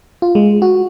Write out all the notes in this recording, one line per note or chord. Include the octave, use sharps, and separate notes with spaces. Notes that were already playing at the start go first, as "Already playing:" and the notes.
F4
G#3
F#4